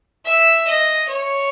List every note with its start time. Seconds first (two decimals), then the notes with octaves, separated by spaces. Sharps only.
0.25 E5
0.67 D#5
1.08 C#5